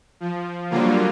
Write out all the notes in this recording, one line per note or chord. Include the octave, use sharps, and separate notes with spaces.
F3
D3 F#3 G3 A#3 F4